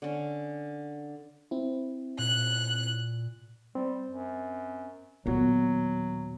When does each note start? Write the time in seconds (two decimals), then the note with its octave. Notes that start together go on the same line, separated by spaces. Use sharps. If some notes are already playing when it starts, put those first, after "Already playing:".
0.02 D3 C#4
1.51 C4 E4
2.19 A#2 F#6
3.75 G3 C4
4.09 F#2
5.26 D#2 A#2 F#3 B3 F#4